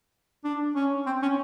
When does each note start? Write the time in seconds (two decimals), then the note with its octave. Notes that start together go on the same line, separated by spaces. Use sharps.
0.44 D4
0.75 C#4
1.06 C4
1.22 C#4